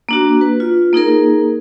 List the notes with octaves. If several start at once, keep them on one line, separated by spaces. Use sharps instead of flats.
A#3 D4 F#4
B4
F4
A#3 D#4 G#4 A#4